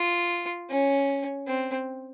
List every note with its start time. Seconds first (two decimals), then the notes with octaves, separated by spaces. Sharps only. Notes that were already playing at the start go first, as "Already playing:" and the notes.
Already playing: F4
0.70 C#4
1.46 C4